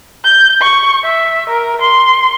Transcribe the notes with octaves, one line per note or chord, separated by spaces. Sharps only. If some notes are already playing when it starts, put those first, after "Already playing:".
G6
C#6
E5
A#4
C6